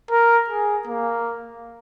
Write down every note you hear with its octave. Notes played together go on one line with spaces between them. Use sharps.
A#4
G#4
A#3